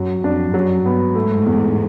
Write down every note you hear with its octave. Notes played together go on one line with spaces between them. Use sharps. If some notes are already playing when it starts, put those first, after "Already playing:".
Already playing: F#2 F#3
F2 D4
F#2 F#3
G2 B3
G#2 A3
E2